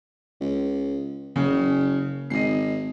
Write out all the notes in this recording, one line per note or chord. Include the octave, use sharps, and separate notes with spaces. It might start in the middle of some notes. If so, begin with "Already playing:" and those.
C#2
F#1 C#3
G#1 D#5 C7